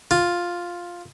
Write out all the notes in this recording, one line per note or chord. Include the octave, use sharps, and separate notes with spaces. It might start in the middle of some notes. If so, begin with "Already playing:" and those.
F4